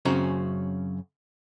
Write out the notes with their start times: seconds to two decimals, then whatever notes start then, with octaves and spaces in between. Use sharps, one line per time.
0.05 F#2 C#3 C4 C#4 F#4 A#5